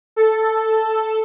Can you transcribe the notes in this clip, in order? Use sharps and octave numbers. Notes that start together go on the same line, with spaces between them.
A4